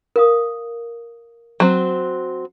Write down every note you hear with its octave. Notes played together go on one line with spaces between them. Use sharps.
A#4 F5 D#6
F#3 C4